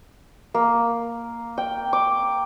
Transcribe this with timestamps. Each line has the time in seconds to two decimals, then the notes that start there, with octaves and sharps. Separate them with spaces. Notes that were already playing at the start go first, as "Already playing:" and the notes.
0.54 A#3
1.58 G5
1.93 D6